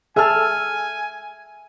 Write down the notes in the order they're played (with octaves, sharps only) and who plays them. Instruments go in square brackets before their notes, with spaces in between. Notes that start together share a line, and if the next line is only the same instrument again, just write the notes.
[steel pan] G#4 A4 A5 [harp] E5 F6 [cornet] G#5